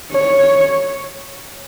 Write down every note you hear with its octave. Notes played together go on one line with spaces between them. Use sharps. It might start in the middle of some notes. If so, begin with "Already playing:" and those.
C#5